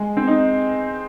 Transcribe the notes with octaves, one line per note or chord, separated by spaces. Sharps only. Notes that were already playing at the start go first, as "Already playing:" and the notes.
Already playing: G#3
C4
D#4